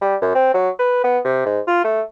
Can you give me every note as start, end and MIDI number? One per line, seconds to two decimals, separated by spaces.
0.02 0.16 55
0.21 0.31 42
0.35 0.49 60
0.54 0.70 54
0.79 1.02 71
1.04 1.19 59
1.25 1.44 48
1.46 1.60 44
1.68 1.83 65
1.84 2.02 57